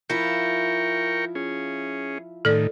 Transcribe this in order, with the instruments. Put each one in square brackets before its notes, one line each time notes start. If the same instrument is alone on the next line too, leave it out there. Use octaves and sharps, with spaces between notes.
[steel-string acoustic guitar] F3 E4 F4 [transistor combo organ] A#4 G5 C#6
[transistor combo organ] C#4 G#4
[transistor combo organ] A2 D#3 [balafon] A4 D5